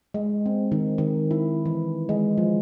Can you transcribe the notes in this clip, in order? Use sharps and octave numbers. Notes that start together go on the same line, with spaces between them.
G#3
C4
D#3
D#3
E4
E3
G#3
F3